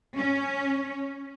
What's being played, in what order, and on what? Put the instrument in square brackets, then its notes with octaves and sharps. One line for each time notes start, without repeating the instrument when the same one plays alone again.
[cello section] C#4